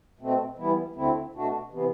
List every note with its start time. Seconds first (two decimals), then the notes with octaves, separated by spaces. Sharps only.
0.19 B2 A3 C4
0.58 E3 G3 B3 E4
0.96 D2 D3 A3 C4 E4
1.34 B2 A3 D4 F#4
1.71 C3 E3 B3